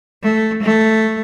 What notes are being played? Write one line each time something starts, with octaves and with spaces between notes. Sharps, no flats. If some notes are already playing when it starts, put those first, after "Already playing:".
A3
A3